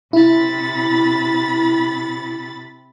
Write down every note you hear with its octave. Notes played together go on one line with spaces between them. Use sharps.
C3 E4 B5 A6